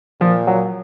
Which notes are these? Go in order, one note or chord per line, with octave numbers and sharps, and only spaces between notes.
A#2 F3
F#3